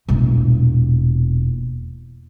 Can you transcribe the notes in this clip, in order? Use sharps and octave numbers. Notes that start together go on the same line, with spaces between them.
E1 A#2